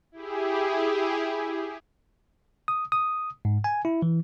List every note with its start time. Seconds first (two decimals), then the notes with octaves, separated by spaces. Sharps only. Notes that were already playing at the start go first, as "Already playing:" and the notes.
0.12 E4 G4 G#4
2.68 D#6
2.92 D#6
3.45 G#2
3.64 G#5
3.85 E4
4.02 E3